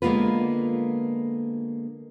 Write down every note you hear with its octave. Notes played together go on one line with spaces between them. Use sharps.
D3 G#3 A#3 B3 F4 B4